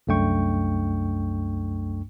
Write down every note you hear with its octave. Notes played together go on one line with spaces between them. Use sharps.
C2 F#2 A3 D4 G5 C#6